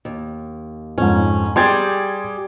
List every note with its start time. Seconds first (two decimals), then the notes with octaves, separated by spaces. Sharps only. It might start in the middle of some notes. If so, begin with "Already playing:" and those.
0.05 D#2
0.98 F2 G#2 C#4
1.56 G3 G4 G#4 C6 G#6 A6